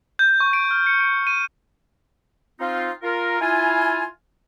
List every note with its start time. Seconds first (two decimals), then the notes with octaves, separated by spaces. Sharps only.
0.19 G6
0.40 C#6
0.53 D7
0.71 F6
0.87 C#7
1.00 D7
1.27 D#7
2.60 C4 D#4 F4
3.02 F4 A#4
3.41 E4 F4 G#5